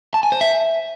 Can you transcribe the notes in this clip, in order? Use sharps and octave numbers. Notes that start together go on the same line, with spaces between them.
A5
G#5
C5
E5